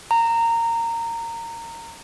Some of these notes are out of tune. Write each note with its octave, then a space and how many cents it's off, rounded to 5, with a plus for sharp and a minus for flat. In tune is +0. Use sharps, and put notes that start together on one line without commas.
A#5 -20